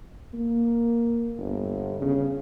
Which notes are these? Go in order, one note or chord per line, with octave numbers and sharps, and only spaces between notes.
A#3
G1
C#3